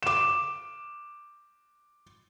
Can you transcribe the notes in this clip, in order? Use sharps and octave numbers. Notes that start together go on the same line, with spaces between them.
D6 E7